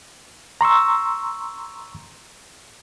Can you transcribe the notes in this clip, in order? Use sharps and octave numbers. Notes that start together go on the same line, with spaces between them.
A#5 C6 C#6 E6